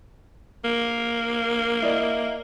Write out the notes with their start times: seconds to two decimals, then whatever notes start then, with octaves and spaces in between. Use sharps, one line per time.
0.64 A#3
1.82 E4 D5 D#5